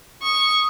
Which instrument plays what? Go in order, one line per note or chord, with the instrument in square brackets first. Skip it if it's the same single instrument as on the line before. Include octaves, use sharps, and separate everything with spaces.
[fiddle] C#6 [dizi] D#6